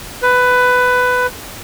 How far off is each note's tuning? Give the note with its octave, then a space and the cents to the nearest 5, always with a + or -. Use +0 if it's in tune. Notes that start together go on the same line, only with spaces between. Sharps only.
B4 +15